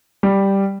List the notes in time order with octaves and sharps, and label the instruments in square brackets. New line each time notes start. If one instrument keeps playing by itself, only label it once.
[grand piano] G3